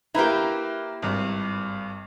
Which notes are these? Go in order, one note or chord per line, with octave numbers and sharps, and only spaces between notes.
A#3 E4 G4 B4 A#5
G#1 G2